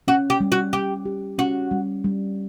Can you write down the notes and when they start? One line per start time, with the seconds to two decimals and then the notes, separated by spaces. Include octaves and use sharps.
0.08 C#4 F#4
0.30 G4
0.40 G3
0.52 F#4
0.73 G3 G4
1.05 G4
1.38 C#4 F#4
1.71 G3
2.04 G3